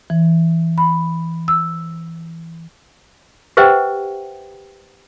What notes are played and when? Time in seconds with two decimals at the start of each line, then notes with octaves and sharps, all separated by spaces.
0.10 E3
0.78 B5
1.48 E6
3.57 G4 B4 C5 E5 F#5 G5